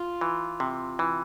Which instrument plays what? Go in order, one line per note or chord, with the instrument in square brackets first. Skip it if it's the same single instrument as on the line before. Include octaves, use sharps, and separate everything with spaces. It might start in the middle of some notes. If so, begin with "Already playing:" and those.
Already playing: [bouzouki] F4
[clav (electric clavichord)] E3
C3
E3